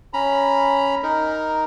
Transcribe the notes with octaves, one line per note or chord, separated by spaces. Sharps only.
C#4 A#5 B5
D#4 A#4